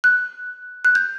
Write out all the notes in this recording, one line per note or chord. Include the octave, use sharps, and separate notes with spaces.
F#6
F#6
G6